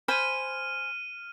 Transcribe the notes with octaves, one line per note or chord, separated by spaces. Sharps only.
C5 G#5 B5 F6 D#7